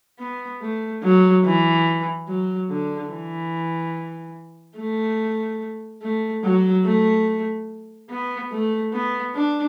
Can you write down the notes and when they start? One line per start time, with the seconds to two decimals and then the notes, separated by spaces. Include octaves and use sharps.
0.19 B3
0.62 A3
1.03 F#3
1.45 E3
2.28 F#3
2.69 D3
3.11 E3
4.77 A3
6.02 A3
6.43 F#3
6.84 A3
8.10 B3
8.51 A3
8.93 B3
9.34 D4